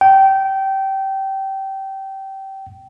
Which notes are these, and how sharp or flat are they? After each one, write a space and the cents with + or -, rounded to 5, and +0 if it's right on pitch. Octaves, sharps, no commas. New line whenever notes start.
G5 -20